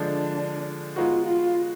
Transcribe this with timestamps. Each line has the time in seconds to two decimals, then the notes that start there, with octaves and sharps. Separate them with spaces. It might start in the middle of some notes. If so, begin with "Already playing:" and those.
Already playing: D3 F3 G#3 D4
0.96 G#3 B3 D#4 F4 F#4
1.26 F4